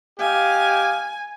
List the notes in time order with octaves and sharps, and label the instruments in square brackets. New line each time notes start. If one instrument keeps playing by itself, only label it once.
[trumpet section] G4 D#5 F5 [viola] G#5